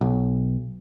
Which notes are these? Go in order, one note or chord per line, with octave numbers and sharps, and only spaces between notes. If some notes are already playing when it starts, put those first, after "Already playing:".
B1